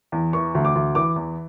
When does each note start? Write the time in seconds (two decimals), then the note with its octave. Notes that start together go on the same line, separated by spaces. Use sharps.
0.12 E2
0.33 E3 C#6
0.55 D2
0.65 D6
0.75 D2
0.95 E3 D6
1.16 E2